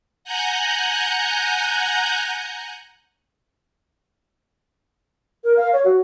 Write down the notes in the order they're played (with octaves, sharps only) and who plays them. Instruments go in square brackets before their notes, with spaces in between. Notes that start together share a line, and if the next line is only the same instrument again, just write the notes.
[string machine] F#5 G#5 A#5 F#6 G6
[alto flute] A#4
F5
C#5
F#4